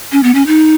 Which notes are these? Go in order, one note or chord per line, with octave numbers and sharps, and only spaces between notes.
C#4
B3
C#4
D#4